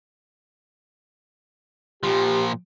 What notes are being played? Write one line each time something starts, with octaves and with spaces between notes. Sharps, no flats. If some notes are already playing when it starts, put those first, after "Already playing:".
A#2 F3 G4